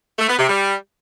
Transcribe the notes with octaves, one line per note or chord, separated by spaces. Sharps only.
A3
B3
C3
G3